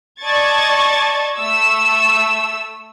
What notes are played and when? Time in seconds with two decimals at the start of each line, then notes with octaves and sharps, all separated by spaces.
0.21 D5 D#5 A5 C#6 G#6 A6
1.37 A3 E6